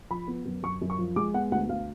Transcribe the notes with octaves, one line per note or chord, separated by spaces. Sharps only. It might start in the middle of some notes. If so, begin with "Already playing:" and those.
F3 B5
B3
F#2
F#2 C#6
F#2
C#6
F3
G#3 D6
B3 F#5
D2 F#5
D2 F5